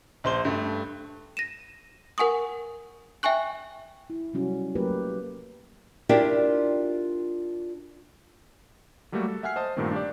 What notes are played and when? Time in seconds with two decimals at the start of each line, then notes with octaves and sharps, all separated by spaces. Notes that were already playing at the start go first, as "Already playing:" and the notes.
0.24 A#1 C5 G7
0.45 G2 A3
1.37 A#6 D#7 E7
2.18 A#4 F#5 G#5 C#6 D#6
3.23 E5 G5 G#5 C#6 F#6
4.10 E4
4.34 C3 F#3 G3 C#4 F#4
4.75 F#3 A3 A#3 G4 A#4 B4
6.09 D4 E4 F4 G4 A#4 D5
9.12 F#3 G3 A3 A#3 F#4
9.28 A4
9.43 E5 F#5 G#5 F6 C7
9.56 C5 D#5 A5 D#6
9.77 G2 A#2 D#3 A3 C4
9.92 D4 G4 D5